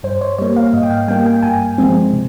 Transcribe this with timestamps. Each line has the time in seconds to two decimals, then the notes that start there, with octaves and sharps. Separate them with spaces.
0.03 G2 C5
0.21 C#5
0.38 G3 A#3 C#5
0.56 F5
0.73 G#2 D#5
0.83 G5
0.90 F5
1.08 G3 A#3 G5
1.26 G5
1.43 G2 G#5
1.78 F3 G#3 C4
2.13 C3